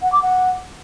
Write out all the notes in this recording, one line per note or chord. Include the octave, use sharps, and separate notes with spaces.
F#5
D6
F#5